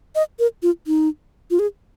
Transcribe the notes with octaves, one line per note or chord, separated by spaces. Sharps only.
D#5
A#4
F4
D#4
F4
G#4